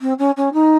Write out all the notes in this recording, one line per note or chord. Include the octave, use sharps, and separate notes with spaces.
C4
C#4
C#4
D#4